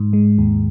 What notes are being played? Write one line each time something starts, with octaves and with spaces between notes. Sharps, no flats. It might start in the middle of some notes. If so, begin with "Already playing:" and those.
Already playing: G#2
G#3
D#2